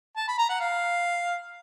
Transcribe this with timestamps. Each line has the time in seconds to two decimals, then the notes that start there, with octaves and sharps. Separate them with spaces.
0.17 A5
0.28 B5
0.38 A#5
0.49 F#5
0.60 F5